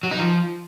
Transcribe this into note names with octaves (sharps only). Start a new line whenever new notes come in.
F#3
D#4
F3